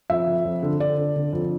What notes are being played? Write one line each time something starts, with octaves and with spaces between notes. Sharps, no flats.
F2 E5
F3
F2
D3
D3 D5
D3
D3
F2